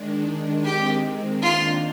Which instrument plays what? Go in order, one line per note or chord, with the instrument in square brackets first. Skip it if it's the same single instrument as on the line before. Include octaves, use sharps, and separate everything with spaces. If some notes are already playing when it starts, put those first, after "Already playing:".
Already playing: [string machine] D#3 G#3 D4
[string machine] D#3 G#3 C4 [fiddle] G4
[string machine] D#3 A#3 D4 [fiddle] F4